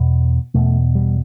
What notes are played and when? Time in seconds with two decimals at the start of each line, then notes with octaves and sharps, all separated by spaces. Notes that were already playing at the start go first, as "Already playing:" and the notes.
Already playing: E2 B2
0.54 E2 B2 A3
0.95 G3